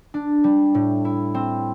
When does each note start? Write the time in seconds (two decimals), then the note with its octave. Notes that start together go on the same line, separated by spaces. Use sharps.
0.14 D4
0.44 G3
0.74 A2
1.05 E4
1.34 C4